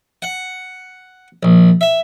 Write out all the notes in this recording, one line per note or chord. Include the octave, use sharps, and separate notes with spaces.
F#5
A#1
E5